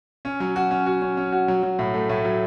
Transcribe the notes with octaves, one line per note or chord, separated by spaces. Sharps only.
C#4
F#3
F#4
C#4
F#4
C#4
C#4
F#4
F#3
F#3
A2
A3
A2
F#3